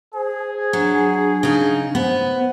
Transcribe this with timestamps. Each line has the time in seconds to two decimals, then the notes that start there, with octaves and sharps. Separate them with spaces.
0.14 G#4 C5
0.73 F#3 D4
1.43 C#3 D#4
1.95 B3 C5